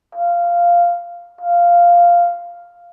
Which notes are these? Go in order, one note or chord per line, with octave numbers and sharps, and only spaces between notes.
F5
F5